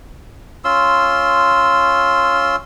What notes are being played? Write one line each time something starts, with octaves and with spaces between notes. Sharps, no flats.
C#4 F4 C6 E6